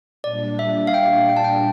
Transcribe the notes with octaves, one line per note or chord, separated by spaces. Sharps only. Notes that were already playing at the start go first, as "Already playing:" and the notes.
A#2 G3 D4 D5
E5
F5
G5
G5
A5
G5